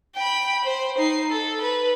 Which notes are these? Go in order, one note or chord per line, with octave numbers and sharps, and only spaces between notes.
G5 B5
C5
D#4 C7
A4
B4